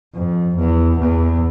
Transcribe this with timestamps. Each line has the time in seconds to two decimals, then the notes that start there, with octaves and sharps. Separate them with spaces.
0.14 F2
0.57 E2
0.99 E2